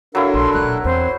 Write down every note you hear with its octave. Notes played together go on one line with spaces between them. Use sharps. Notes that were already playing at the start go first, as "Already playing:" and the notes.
F#3 D4 E4 A4 A#4 F5
A#1 A#3 C6
D#1 B1 F#6
E2 C4 C5